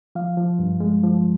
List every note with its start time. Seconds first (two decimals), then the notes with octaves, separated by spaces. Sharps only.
0.15 F3 F5
0.37 F3
0.59 G2
0.80 G#3
1.03 F3